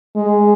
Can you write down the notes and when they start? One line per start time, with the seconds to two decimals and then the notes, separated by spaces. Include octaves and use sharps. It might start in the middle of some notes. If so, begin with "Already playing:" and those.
0.17 G#3